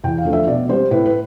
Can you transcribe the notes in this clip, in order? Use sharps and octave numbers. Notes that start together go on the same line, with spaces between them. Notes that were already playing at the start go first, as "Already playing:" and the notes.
E2 G5
F5
D3 F3 A3
E5
B2 D5
G3 C4 C5
A2 B4
B4